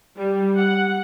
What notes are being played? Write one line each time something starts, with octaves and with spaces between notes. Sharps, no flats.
G3
F#5